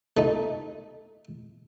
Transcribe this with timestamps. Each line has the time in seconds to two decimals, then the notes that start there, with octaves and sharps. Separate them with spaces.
0.17 A3 D#4